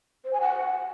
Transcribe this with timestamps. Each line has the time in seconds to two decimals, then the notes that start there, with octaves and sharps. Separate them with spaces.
0.24 C5
0.33 G#5
0.41 F#5